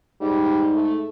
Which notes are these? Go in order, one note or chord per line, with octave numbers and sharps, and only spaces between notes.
G#2 G3
A3